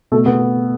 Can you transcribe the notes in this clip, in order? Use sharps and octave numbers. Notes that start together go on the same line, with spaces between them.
B2 A3
B3